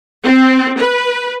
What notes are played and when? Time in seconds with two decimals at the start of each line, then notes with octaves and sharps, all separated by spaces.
0.25 C4
0.80 B4